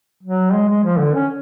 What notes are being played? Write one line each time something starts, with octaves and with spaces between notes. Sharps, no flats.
F#3
G#3
G#3
F3
D3
C#4